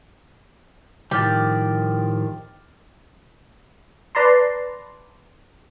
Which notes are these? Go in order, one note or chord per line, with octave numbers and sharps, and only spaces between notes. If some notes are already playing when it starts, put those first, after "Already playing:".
A2 D#3 F3 G3 G4 D6 F6 A6
B4 D5 A5 A#5 C6